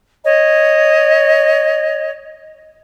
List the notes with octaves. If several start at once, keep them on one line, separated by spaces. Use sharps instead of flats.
C#5 D#5